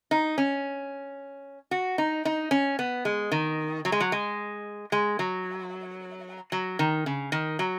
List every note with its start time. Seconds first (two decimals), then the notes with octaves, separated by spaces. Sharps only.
0.11 D#4
0.38 C#4
1.71 F#4
1.98 D#4
2.25 D#4
2.51 C#4
2.79 B3
3.05 G#3
3.32 D#3
3.85 F#3
3.92 G#3
4.00 F#3
4.12 G#3
4.92 G#3
5.19 F#3
6.52 F#3
6.79 D#3
7.06 C#3
7.32 D#3
7.59 F#3